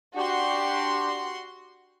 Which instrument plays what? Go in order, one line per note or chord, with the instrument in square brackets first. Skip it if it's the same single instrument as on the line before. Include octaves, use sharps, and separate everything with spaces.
[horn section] D4 G4 [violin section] F#4 C6